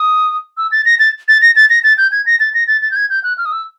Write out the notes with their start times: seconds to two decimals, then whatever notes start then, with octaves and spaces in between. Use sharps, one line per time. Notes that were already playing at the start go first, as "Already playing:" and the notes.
Already playing: D#6
0.58 E6
0.72 A6
0.85 A#6
0.99 A6
1.28 A6
1.42 A#6
1.56 A6
1.70 A#6
1.84 A6
1.98 G6
2.12 G#6
2.26 A#6
2.40 A6
2.54 A#6
2.68 A6
2.82 A6
2.91 G6
2.96 G#6
3.10 G6
3.24 F#6
3.38 F6
3.46 D#6
3.52 E6